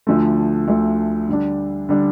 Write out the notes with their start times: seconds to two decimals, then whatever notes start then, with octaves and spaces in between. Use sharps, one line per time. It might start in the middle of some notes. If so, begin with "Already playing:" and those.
0.07 D2 D3 F3 A3
0.68 D2 D3 F3 A3
1.29 D3 G3 D4
1.89 D3 G3 D4